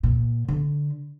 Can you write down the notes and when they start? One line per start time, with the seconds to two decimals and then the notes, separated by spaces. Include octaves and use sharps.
0.03 A#2
0.48 D3